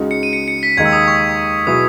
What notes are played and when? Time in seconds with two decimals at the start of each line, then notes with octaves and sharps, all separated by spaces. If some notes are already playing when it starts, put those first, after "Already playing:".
Already playing: C#2 C#3 G#3 D#4 F#4
0.11 C#7
0.23 D#7
0.33 C#7
0.48 C#7
0.63 B6
0.77 D#2 D#3 G#3 D#4 G#6
0.86 E6
0.93 D#6
1.08 C#6
1.67 B2 F#3 B3 E4 G#4 D#6